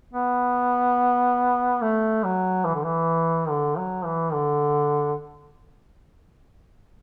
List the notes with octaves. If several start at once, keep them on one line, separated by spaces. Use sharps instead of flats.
B3
A3
F#3
E3
D3
E3
D3
F#3
E3
D3